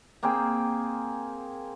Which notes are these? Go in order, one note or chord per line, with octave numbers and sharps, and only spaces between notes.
A#3 C4 G#4 G5